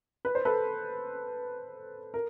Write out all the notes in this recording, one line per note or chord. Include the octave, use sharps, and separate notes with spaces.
B4
C5
A4 B4
A#4